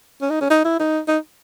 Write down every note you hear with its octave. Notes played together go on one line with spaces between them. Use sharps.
C#4
D#4
C#4
D#4
E4
D#4
D#4